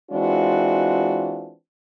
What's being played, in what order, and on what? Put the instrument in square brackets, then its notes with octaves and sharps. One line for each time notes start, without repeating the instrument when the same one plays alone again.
[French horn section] E3 G#3 C4 D4 F4 F#4